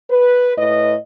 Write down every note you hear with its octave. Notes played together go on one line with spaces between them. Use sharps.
B4
A2 B4 D#5